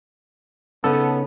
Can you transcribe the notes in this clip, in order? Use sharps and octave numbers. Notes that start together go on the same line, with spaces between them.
C#3 B3 C#4 D#4 A4